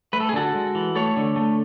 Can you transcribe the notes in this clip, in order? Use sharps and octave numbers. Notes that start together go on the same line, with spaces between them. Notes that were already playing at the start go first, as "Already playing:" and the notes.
A3 B4
A4
G#4
D3 F#4 A4
G#3
E3
A3 A4 C#5
D3
A3